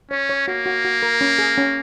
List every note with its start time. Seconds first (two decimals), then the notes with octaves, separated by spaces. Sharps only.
0.11 C#4 C#5
0.29 C#5
0.48 A#3 F#4
0.66 F#4
0.85 F#4
1.02 A#4
1.21 C#4
1.38 G#4
1.58 C#4